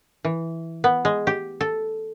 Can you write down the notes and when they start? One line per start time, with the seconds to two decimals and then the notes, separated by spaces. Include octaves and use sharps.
0.25 E3
0.84 B3
1.05 G#3
1.27 G4
1.61 A4